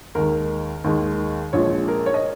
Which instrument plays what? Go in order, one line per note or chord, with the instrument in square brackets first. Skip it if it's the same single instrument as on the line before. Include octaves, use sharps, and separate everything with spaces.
[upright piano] D#2 D#3 G#3 A#4
D#2 D#3 G#3
A#1 A#2 F3 G#3 C#5
A#4
C#5
D#5